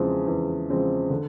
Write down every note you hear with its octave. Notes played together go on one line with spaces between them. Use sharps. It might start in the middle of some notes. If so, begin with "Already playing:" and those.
Already playing: E2 C#3 F3 G#3 C4
E2
C#3 F3 G#3 C4
D3